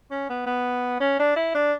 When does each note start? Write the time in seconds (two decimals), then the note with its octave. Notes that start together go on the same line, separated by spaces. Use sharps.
0.11 C#4
0.29 B3
0.46 B3
1.00 C#4
1.19 D4
1.36 E4
1.55 D4